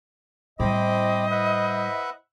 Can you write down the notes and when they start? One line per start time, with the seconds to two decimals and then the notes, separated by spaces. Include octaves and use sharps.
0.60 A2 G3 C4 E4 C5 D#5 B5 D6
1.31 B4 E5 F#5